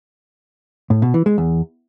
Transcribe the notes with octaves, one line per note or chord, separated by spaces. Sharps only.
A2
B2
E3
G#3
E2